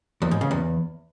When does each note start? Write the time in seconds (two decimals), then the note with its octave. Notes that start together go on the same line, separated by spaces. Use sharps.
0.22 E2
0.31 G#2
0.41 C#3
0.51 E2